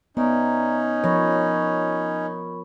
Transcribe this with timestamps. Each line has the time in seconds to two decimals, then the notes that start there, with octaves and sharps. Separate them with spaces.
0.17 B3 C#4 D#4 D5 E5 A#5
1.04 F3 A#4 C#5 B5 C#6